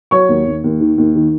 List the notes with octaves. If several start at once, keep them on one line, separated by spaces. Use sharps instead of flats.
F#3 C#5 C#6
D#2
D#2
D#2
D#3
D#2
D#3